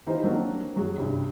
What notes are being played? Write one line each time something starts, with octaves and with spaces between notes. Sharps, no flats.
E3 D#4 F4 G4 C5
F#3 A#3 C4 D4 F#4 A#4
F#2 F#3 F#4 G#4
C2 G2